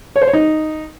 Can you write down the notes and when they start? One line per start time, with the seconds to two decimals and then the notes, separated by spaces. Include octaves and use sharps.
0.16 C#5
0.22 C5
0.27 C#5
0.33 D#4